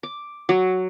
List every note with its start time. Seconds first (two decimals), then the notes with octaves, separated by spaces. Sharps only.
0.03 D6
0.49 F#3